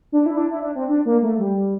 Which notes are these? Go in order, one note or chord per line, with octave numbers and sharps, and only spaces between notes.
D4
E4
D4
E4
D4
C4
D4
A#3
A3
G3